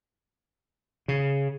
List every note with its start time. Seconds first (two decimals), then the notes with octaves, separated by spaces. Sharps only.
1.08 C#3